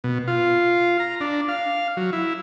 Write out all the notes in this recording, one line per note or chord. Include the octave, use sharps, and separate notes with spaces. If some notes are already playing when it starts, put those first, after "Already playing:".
B2
F4
A#5
D4
F5
F#3
E4